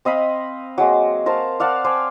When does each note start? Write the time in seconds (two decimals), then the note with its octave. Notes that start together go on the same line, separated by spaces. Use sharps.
0.05 C4 D#5 F5 B5
0.78 F#3 G#3 A#3
1.26 A#4 C5 F5 A5
1.60 D5 F5 F#5 A5
1.84 C5 D5 G5 G#5